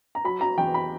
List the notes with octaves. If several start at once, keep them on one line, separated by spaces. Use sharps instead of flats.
A#5
F#3 B5
F#3 A#5
E2 G5
B5